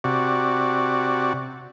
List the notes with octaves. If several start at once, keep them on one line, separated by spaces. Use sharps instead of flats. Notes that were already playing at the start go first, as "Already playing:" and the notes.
C3 F#4 D5